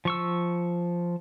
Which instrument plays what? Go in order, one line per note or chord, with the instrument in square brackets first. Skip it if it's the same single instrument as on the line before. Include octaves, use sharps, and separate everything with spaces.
[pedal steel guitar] F3 C#6 E6